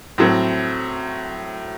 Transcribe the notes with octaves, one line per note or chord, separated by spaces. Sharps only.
A2 F#3 C4